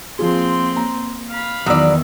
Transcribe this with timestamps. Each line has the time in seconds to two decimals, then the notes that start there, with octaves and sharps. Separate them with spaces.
0.19 F3 A#3 C4 F4 G#4 C6
0.76 A#5
1.29 F5 B5
1.66 E2 D#3 F#3 D5 D#6 E6